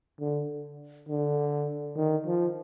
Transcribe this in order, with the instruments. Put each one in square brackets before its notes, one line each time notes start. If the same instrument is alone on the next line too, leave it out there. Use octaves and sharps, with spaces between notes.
[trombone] D3
D3
D#3
F3